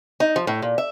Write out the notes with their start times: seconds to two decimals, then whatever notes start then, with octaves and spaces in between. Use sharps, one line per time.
0.20 D#4
0.36 F3
0.47 A2
0.62 A#2
0.78 E5